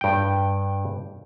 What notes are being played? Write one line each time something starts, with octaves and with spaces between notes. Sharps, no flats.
G2 G5